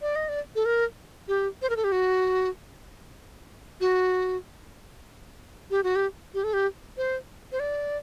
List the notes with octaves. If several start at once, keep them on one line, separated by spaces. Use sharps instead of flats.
D5
D#5
D5
A4
A#4
G4
C5
A#4
A4
G4
F#4
F#4
G4
F#4
G4
G4
A4
G4
C5
C5
D5